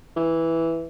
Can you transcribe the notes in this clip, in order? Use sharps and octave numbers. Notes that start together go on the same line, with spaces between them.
E3